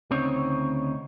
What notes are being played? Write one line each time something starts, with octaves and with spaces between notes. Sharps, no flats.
D2 C#3 C4 D#4 C#5